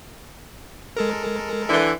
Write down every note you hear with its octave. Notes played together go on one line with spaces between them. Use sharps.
G#3 A4 A#4
D3 E3